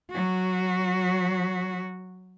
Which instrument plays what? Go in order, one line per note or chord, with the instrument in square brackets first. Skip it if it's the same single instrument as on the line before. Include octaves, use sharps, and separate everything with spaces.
[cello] F#3 F#4